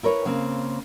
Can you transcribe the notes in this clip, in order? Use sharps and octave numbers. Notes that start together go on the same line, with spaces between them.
E4 A#4 B4 C#5
C#3 A#3 C4